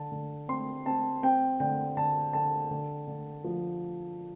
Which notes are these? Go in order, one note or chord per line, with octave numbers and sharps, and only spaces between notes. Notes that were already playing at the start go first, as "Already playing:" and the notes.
Already playing: D3 A5
D3
C4 C6
C4 A5
C4 G5
D3 G5
D3 A5
D3 A5
D3
D3
F3